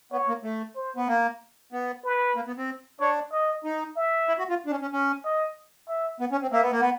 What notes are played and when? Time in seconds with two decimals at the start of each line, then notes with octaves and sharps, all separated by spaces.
0.12 B3 C#5
0.28 A#3
0.43 A3
0.76 C5
0.96 B3
1.08 A#3
1.72 B3
2.04 B4
2.36 A#3
2.47 B3
2.58 C4
3.00 D4 C#5
3.32 D#5
3.64 D#4
3.96 E5
4.28 E4
4.38 F#4
4.50 F4
4.66 D4
4.71 C#4
4.82 C#4
4.93 C#4
5.25 D#5
5.88 E5
6.20 B3
6.32 C#4
6.42 C4
6.52 A#3 E5
6.62 B3
6.71 A#3
6.80 B3